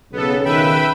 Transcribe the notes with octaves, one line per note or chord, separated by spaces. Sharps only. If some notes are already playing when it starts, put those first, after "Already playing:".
B1 C#3 B3 A4
D#3 B4 E5 G5 B5